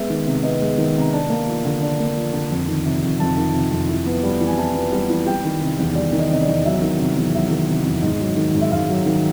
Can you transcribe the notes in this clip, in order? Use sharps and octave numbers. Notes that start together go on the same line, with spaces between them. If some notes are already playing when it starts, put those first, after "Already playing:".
Already playing: G#3 B3 E5
D#3
C3
B3 D#5
G#3
D#3
C3
A#5
D4 A5
A#3
F3
D3
D4
A#3
F3
D3
F2
D#3
C3
F2
F2 A5
D#3
C3
F2
E4
B3
G3
E3
G#5
E4 A5
B3
G3
E3
G3 G5
D#3
C3
E2
G3 D5
D#3
D#5
C3 D#5
D5
E2
F#3 E5
D#3
C3
E2
F#3 E5
D#3
C3
E2
G#2 D#5
F#3
D#3
G#2
E5
G#2 F5
F#3
D#3